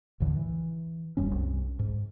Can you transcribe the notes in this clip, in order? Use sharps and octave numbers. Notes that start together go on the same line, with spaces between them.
A1 D#2 D3 E3
E3
D#1 F#2 G3 C#4
C2
G#2